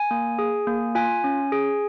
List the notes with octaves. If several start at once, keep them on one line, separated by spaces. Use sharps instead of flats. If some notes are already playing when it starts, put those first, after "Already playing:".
Already playing: G#5
A#3
G#4
A#3
F4 G#5
C#4
G#4